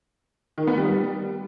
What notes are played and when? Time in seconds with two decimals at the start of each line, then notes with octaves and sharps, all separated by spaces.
0.58 D#3
0.67 B3
0.77 G3